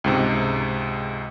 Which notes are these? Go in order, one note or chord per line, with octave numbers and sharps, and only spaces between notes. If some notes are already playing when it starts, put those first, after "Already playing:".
C#2 G#2 C3